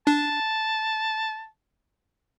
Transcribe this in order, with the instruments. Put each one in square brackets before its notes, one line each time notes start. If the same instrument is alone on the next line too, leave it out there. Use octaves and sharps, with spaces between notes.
[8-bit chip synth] D4 [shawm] A5